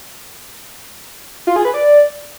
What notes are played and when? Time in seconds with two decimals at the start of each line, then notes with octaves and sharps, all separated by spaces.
1.47 F4
1.56 G#4
1.65 B4
1.74 D5